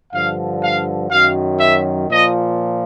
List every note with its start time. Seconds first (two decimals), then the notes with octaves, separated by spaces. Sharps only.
0.13 G2 D3 F3 F5
0.61 F5
1.10 F#2 D#3 F#3 F5
1.59 E5
2.08 A#2 F3 D#5